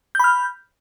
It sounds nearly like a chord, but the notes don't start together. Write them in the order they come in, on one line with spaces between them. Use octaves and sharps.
G6 B5 F6